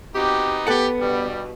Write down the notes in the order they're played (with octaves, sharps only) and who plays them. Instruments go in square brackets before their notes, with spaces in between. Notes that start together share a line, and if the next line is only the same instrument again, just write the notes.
[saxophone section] C3 F#4 G4 [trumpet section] B3 D#4
[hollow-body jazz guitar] B3 A4 F#5 [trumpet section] G4
[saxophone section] G2 B2 [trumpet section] G3